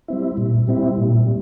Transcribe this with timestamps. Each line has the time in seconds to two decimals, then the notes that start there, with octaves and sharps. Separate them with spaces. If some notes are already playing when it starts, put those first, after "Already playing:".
0.08 G3 C4 E4
0.37 A#2
0.67 G3 C4 E4
0.97 A#2
1.26 G3